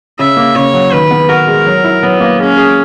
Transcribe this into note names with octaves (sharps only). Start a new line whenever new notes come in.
C#3 E5
A#3
C#3 C#5
F#3
D#3 B4
B3
F#4 A#4
G#3
F#3
E4
F#3 B3
A#3
G#3 C#4
G#4